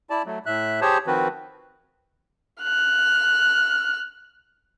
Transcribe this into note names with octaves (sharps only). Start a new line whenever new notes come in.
E4 D5 A5
F#3 A3
A2 E5 F#6
G4 G#4 C5 C#5 A5
D#3 F3 C4 F#4 B4
F6 F#6